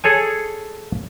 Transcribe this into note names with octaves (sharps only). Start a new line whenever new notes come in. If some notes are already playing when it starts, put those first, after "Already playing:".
G#4 A4 C#5 G#5